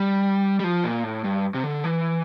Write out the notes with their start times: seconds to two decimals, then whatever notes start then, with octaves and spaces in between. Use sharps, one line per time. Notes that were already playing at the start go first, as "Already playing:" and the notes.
Already playing: G3
0.60 G3
0.64 F3
0.84 A#2
1.04 A2
1.24 G2
1.54 C3
1.64 D3
1.84 E3